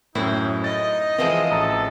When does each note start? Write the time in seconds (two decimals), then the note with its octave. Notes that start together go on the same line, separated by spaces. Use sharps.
0.15 F#2 A2 C4 D#4 E4
0.64 D#5 A6
1.18 E3 F3 G#3 C4 D#6
1.51 A1 A4 A#5